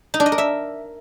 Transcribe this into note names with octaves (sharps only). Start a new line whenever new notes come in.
D#4
D4
D#5
A#4
E5